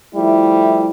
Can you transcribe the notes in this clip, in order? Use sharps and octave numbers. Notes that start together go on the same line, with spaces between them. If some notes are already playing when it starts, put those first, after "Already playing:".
F3 G3 A3 E4